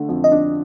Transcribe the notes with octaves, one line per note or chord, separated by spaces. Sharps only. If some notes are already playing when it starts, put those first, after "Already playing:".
Already playing: D3 A3
F2
D#5
D4